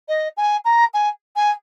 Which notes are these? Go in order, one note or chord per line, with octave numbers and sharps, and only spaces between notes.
D#5
G#5
A#5
G#5
G#5